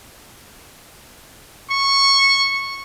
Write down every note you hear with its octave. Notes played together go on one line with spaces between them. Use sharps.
C#6